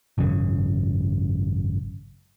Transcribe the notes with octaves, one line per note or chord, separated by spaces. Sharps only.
G#1 F#2 C#3